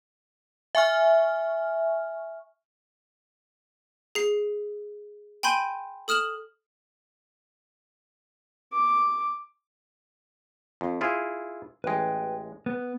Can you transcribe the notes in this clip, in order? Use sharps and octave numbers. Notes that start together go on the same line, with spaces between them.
E5 G#5 C#6 F6
G#4 C7
G5 G#5 B5 C6 G6 D#7
A4 D#6 F6 E7 F#7
D6
F2
E4 F4 G#4
A1 G#3 B4 G5
B3